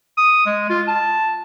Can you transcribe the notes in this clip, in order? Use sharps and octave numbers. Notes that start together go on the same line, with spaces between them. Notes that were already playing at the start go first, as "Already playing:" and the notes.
D#6
G#3
F4
A5